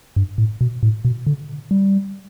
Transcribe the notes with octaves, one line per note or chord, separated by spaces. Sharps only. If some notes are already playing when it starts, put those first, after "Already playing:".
G2
A2
B2
A2
B2
D3
G3